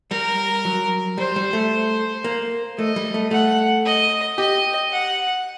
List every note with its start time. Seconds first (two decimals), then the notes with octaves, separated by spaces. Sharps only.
0.11 G3 A#4
0.65 F#3
1.18 G3 C5
1.36 G3
1.53 A3
2.24 A#3
2.78 A3 D#5
2.96 G3
3.14 A3
3.31 A3 F#5
3.85 D#5
4.38 G4 D#5
4.92 F#5